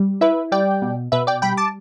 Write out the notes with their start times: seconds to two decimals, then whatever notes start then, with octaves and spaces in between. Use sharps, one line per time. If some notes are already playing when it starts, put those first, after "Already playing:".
Already playing: G3
0.21 E4 B4 E5
0.52 G3 D5 G5
0.82 B2
1.12 B2 B4 E5
1.27 D5 G5
1.42 G3 G5 B5
1.57 A5 D6